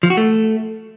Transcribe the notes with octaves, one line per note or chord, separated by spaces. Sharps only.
F3
F#4
A3